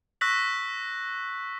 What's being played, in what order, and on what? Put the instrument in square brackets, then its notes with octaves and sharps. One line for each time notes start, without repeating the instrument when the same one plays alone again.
[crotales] C#6 E6 F#6 A#6 B6 F#7